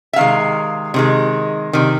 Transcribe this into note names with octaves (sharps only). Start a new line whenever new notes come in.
E5
C3 D#3 G#3 F5
C3 D#3 G#3
C3 D#3